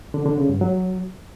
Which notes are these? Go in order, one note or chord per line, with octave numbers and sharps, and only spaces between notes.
D3
D3
C#3
G2
F#3